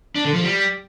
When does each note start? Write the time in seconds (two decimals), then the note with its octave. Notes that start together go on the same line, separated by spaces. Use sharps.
0.16 D4
0.25 D3
0.34 F3
0.43 G3